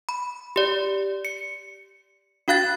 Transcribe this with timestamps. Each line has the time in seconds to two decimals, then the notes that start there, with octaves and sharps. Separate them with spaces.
0.09 B5
0.56 G4 D5
1.25 C#7
2.48 D4 F#4 F5 F#6 A6